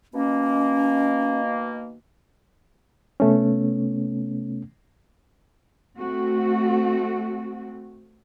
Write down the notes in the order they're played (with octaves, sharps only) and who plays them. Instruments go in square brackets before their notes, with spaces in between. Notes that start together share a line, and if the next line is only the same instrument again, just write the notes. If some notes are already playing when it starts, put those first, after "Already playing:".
[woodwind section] B2 D#3 A#3 [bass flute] C#4
[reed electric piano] C3 A3 B3 C#4
[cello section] A3 C4 F#4